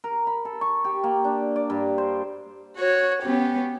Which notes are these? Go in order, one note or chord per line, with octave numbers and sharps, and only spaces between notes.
A#4
B5
A4
C#6
G4
A#3
D4
D5
G2
C5
F#4 C#5
B3 C#4 G4